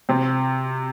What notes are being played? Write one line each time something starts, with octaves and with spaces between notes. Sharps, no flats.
C3 C4